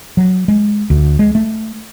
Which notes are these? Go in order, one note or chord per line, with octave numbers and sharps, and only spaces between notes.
F#3
G#3
D2
G#3
A3